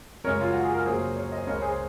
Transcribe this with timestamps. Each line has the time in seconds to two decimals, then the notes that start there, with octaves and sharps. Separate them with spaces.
0.24 F#2 C#3 G#3 A#4 C#5
0.41 F4
0.52 F#4
0.63 G#4
0.75 A#4
0.86 F#2 C#3 F#3 A#3 G#4 C5
1.16 A#4 C#5
1.32 C5 D#5
1.47 C#2 C#3 G#3 A#4 C#5
1.62 G#4 C5